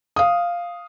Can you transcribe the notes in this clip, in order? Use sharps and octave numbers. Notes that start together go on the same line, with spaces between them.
F5 D#6